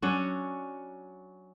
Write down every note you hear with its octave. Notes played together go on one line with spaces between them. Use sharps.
F#3 C#4 D4 F#4